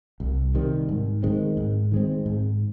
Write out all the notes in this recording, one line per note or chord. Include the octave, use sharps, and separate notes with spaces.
C2
C3 D#3 G3
G#2
D#3 G#3 C4
G#2
D#3 G#3 C4
G#2